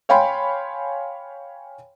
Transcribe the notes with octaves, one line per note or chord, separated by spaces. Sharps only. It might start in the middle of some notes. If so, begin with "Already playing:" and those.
C#5 F5 G5 G#5 B5 C6